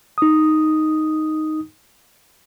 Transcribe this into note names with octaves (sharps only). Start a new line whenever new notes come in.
D#4 D#6